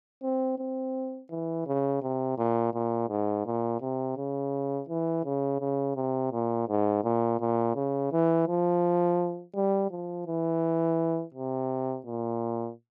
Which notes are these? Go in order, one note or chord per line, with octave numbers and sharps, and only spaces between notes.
C4
C4
E3
C#3
C3
A#2
A#2
G#2
A#2
C3
C#3
E3
C#3
C#3
C3
A#2
G#2
A#2
A#2
C#3
E3
F3
G3
F3
E3
C3
A#2